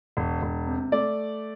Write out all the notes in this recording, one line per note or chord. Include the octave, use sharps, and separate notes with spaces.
E1
E1
C3
A3 D5